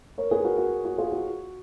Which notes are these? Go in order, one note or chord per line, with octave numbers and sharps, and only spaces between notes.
A#4 C#5
G#4 B4
F#4 A#4
F#4
F#4
F4 G#4
F#4